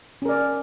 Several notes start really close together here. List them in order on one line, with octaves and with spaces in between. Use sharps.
C#4 A#4 D5